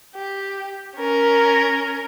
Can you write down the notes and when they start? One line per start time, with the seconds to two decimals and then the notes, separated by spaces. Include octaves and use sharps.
0.16 G4
0.97 C#4 A#4